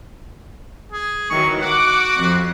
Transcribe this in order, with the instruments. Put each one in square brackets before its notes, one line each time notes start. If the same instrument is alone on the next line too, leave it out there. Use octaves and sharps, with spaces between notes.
[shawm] G#4
[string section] D#3 E3 F#3 [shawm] C#6
[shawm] F#4 [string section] F#5 D6
[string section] F2